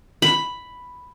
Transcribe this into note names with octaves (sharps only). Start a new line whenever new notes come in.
B5